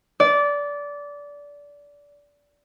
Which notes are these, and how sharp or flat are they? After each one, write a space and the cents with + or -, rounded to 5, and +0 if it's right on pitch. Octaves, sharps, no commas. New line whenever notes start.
D5 -20